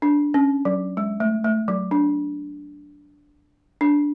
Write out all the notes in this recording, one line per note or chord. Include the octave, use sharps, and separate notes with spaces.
D4
C#4
F#3
G#3
A3
A3
F#3
D4
D4